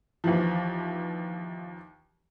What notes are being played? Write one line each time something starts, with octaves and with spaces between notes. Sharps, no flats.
D#2 E3 F3